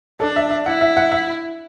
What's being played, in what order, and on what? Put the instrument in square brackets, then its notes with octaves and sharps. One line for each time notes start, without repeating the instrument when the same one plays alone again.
[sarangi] D4 [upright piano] A4
[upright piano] E5
E5
[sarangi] E4 [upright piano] F#5
[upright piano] E5
F#5
E5